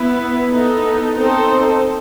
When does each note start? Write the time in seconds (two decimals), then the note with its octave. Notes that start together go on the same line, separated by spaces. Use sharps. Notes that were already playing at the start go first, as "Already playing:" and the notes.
Already playing: B3 E4 B4
0.50 B3 D#4 A4
1.14 C4 D#4 A4 C5